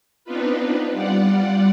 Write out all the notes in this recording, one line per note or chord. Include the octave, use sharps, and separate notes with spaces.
B3 C4 D4 D#4 F4 B4
G3 F4 D5 F#5